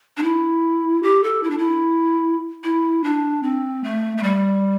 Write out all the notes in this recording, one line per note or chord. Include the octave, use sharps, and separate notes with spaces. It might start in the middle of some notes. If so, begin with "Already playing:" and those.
D4
E4
G4
A4
E4
D4
E4
E4
D4
C4
A3
A3
G3